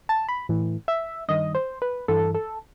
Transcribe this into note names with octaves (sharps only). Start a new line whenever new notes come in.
A5
B5
A2 E3
E5
G2 D#3 D#5
C5
B4
G2 E3 A4
A4